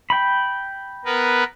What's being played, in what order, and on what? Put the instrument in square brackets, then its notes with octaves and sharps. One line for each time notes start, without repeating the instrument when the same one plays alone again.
[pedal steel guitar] G5 B5
[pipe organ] B3 A#4 B4